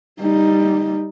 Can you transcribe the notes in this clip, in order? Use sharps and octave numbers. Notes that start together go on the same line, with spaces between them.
G3 D#4